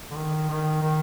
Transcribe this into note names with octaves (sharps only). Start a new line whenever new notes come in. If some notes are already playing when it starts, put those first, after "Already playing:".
D3
D#3
D#3
D#3